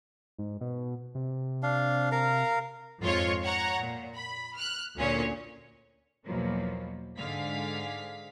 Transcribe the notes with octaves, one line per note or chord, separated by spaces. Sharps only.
G#2
B2
C3
D4 F5
A#4 F5 A#5
F2 G#2 F4 C#5
C#5 F#5 A#5
A#2
B5
F6 F#6
D2 A#2 C#4 C#5
B1 E2 B2 F3 F#3 A#3
G#2 D3 G#4 F5 B6